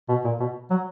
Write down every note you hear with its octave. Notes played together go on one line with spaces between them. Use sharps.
B2
A#2
B2
F#3